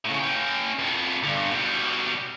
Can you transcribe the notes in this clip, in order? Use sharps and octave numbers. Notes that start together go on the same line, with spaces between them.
A2 C#3
C#4 G5
F2 B3
G2 D3
B2 G3